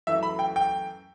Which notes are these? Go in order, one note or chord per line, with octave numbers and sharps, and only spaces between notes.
F#2 E3 A3 E5
B5
G5
G5